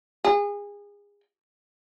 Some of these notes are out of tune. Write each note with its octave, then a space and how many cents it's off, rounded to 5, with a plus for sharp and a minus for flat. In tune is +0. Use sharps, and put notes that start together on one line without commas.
G#4 -30